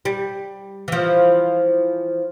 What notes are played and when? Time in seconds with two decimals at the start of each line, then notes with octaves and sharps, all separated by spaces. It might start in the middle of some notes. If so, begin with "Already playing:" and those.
0.05 G3
0.88 E3 F3